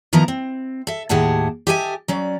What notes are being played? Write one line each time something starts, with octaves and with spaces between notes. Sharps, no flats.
D#3 F3 B3 E4 A#4 A#5
C4
A4 E5
D#2 A2 G4 G#4 F#5 A5
G4 A4 D#5 E5 F#5 G#5
F#3 C#4 D5